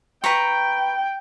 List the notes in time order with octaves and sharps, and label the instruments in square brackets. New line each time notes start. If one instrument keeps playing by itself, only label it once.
[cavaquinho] B4 A#5 C#6 [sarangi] G5